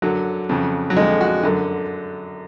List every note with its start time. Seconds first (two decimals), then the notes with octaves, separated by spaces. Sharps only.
0.02 F#2 D3 F#3
0.49 F2 C#3
0.90 F#3
0.97 F2 D3 G#3
1.21 F#4
1.43 F#2 D3